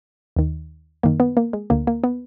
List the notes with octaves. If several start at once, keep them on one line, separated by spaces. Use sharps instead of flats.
D#2 D#3
F#2 D#3 A#3
B3
A#3
G#3
D2 D3 A#3
A#3
B3